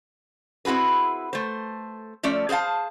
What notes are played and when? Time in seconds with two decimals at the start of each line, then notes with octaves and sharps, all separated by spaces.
0.65 C4 E4 F#4 G#4 B4
1.33 A3 C5
2.23 F3 A3 C#4 D5 E5
2.49 G#4 C5 E5 F5 A5